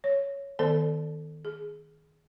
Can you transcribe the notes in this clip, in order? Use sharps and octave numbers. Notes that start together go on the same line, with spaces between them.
C#5
D#3 B3 A4 C5 D5 A5
G#4